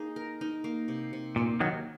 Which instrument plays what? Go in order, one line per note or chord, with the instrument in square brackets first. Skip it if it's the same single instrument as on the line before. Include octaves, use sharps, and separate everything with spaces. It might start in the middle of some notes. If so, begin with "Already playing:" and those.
Already playing: [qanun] A#3 D#4 G#4
A#4
D#4
A#3
C3
C3
[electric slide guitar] A#2 [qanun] A#3
[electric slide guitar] D#3 F#3 [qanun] A#3